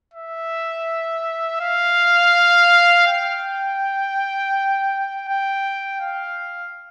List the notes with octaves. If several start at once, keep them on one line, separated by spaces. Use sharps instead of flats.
E5
F5
G5
G5
F5